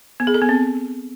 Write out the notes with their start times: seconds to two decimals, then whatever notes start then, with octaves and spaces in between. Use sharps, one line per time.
0.20 B3
0.27 G#4
0.34 A4
0.42 B3
0.49 C4